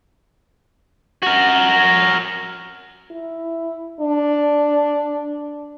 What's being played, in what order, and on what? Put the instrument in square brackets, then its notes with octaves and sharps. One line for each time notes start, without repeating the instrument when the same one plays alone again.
[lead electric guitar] F#4 A#4
[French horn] E4
D4